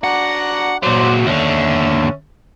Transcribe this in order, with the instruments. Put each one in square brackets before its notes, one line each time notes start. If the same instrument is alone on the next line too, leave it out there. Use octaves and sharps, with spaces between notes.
[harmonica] D4 F#4 A#5 [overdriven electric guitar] F#5
[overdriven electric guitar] A#2 F#3 [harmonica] C5 D5 F#5
[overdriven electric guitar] D#2 D3 [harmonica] C#4 E5